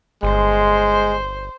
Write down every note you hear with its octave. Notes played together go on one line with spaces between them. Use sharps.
G1 G#3 C5